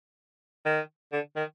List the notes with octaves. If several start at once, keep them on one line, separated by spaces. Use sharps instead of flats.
D#3
D3
D#3